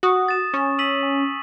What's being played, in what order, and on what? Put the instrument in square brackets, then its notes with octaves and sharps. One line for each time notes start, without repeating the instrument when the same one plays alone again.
[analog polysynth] F#4 [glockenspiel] D#6
[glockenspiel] A6 E7
[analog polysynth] C#4 [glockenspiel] C#6
[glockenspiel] E6 B6 D#7 F#7
G#5